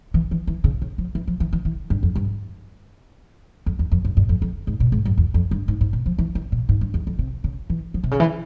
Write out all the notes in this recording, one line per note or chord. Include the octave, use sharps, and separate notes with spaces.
E3
E3
E3
C#3
C#3
F3
E3
F3
E3
E3
E3
G2
F2
G2
F2
E2
F2
G2
G2
F2
F2
G#2
A#2
G#2
G2
E2
F2
G2
G#2
G#2
A#2
F3
E3
E3
A#2
G#2
G2
E2
F2
C3
C#3
E3
F3
C3
C#3
E3